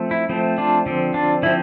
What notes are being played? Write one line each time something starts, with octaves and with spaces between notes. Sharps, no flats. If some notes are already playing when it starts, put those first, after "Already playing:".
Already playing: F3 A3 C4
E4
F3 A3 C4
D4 F4
D3 F3 C4
D4 F4
D3 F3 C4 E4